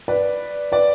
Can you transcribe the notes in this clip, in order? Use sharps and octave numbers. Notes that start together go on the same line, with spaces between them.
B4 D5
B4 D5